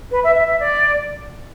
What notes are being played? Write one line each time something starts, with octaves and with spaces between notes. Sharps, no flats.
B4
E5
E5
E5
D5